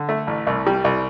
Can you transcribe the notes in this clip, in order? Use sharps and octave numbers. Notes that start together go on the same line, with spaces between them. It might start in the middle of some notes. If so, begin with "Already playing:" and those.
Already playing: D3
A3
A1
C2
G3
C2